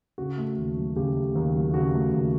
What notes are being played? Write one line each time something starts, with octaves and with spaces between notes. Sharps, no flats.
C#3 F#4
A3
D#2
F#3
C#3 G4
A3
D#2
F#3
C#3 F#4
A3
D#2